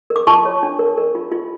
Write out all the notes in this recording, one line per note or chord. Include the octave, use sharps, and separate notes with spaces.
A#4
D6
F4 A5 C#6
C#5
D4
A#4
A#4
F4
F4